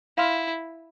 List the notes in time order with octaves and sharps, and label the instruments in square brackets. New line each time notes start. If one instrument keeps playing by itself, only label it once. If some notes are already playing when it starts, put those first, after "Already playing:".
[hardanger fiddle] E4 [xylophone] F5 C6 F6